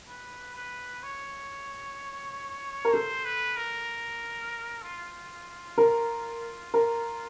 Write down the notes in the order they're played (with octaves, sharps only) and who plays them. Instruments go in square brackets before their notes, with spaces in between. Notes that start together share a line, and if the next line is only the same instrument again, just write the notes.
[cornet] B4
B4
C#5
[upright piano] A#4
[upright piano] A4 [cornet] C5
[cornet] B4
A#4
F4
[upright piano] A#4
A#4